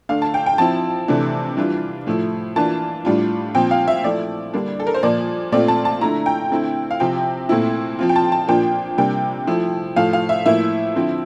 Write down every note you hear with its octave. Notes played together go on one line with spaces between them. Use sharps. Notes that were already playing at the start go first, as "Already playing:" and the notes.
D3 A3 D4 F5
A5
G5
G5
F3 C4 E4 A5
C3 E3 A3 D4
E3 G3 D4 F4
A2 F3 A3 E4
E3 A#3 D4 F4 A5
A2 G3 D4 F4
A#2 F3 C4 G5
F5
E5
F3 A3 E4 D5
D3 G3 A#3 D4
A4
A#4
C5
A#2 F3 A#3 D5
A#2 A3 C4 F4 D5
A5
A5
D3 A3 E4 A#5
G5
D3 A3 C4 E4
F5
C3 F3 C4 G5
A#2 A3 C4 E4
F3 C4 F4
G5
A5
A5
A#2 F3 A#3 D4 F4 G5
C3 G3 A#3 D4 G5
F3 A3 E4
A2 F3 A3 F5
F5
E5
A2 F3 A#3 E4 E5
D3 F3 C4 E4